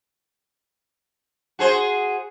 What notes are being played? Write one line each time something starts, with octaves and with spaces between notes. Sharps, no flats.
F#4 G#4 C5